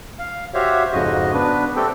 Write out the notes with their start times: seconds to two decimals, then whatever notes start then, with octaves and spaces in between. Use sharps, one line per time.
0.19 F5
0.54 F#4 G4 C5 C#5 E5 F5
0.93 F2 G#2 C#3 F#4 D#5
1.34 B3 D4 B4
1.76 A3 C4 G4 A4 G5